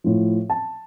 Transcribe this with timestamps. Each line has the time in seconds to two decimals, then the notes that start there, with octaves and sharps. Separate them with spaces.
0.04 A2 F3
0.50 A5